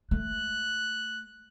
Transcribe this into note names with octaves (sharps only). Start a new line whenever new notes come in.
A3 F#6